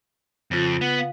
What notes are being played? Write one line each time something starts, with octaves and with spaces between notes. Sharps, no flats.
F2 C#3 F4
B3 F#5
F5